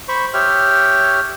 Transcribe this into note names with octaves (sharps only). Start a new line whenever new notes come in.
C5 B5 C#6
G4 C#5 E5 G5 F6